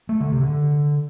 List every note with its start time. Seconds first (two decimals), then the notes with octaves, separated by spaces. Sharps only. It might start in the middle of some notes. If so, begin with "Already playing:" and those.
0.09 A3
0.20 D3
0.32 C3
0.43 D3